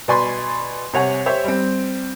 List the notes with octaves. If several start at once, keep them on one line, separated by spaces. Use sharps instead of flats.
B2 D5 G#5 B5 C6
C3 C#5 F#5 G#5
G4 C5 C#5 E5
G3 C4